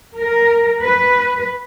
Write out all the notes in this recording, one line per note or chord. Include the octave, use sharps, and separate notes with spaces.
A#4
B4